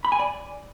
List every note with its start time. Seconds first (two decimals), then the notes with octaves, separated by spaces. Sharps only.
0.05 B5
0.12 G#5
0.19 D5